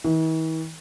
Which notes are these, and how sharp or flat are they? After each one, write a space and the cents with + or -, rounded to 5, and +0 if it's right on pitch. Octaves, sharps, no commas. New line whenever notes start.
E3 -45